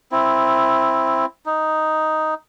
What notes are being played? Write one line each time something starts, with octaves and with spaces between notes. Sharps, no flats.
C4 E4
D#4